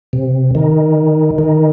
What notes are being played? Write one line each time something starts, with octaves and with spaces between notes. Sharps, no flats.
C3
D#3
D#3